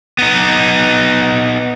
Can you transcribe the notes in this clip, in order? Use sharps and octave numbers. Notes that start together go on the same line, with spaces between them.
B3 D#4